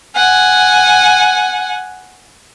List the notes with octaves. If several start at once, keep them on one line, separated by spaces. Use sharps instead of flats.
F#5 G#5